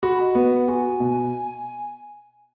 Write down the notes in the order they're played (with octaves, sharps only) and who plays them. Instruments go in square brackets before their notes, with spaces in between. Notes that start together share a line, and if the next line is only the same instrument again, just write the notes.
[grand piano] F#4 [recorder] B5
[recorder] D#5
[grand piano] B3 [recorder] F#5
[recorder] F#5
[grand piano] F#4 [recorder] G#5
[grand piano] B2